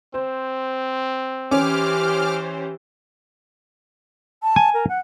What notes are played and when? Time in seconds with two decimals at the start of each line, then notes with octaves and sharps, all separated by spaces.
0.14 C4 C5
1.51 E3 C#4 G4 C5 D6 F6
4.43 A5
4.56 G#5
4.74 A#4
4.89 F#5